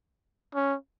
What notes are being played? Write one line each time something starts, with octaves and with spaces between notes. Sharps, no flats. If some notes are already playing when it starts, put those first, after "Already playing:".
C#4